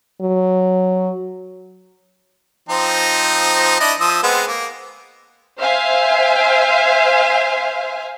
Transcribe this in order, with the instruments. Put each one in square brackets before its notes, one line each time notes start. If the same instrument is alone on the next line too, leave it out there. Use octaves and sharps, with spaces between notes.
[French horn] F#3
[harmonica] F3 C4 D#4
D4 E4 D#5
F3 D#6 E6
G#3 B3 C4
A#3
[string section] C5 E5 F5 G#5